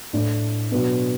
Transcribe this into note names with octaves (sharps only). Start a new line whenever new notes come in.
A2 A3 D4
B2 F#3 B3 D4